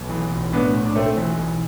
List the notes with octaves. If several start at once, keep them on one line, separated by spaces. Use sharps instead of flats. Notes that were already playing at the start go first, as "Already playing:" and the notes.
Already playing: B1
E3
B1
A2 B3 D4
B1
D4
B1 A3 C4
E3
B1